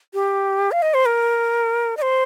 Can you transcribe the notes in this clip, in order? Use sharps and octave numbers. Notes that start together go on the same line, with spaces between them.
G4
F5
D#5
C5
A#4
D#5
C5